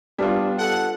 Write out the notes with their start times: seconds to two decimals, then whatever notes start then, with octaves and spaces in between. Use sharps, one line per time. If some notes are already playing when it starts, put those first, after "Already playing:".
0.19 G3 B3 D4 F4
0.59 A4 F#5